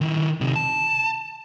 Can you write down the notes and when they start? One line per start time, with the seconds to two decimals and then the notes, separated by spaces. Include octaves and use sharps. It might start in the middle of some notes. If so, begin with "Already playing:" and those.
0.01 D#3 E4
0.41 C3 D#4
0.56 A5